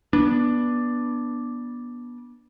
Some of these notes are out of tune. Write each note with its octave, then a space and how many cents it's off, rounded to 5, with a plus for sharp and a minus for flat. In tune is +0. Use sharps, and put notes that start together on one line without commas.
B3 -25 D4 +0